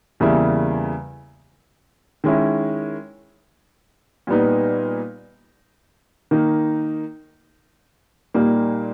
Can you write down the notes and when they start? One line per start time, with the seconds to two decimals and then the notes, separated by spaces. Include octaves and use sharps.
0.20 E2 C#3 G3 A#3 E4
2.24 D#3 G#3 C#4 E4
4.27 A#2 G3 B3 D#4
6.31 D#3 A#3 D#4
8.34 A#2 G3 A#3 D#4